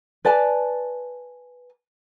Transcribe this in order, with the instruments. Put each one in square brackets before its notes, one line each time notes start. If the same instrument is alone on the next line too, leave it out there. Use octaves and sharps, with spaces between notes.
[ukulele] B4 D5 G#5 A5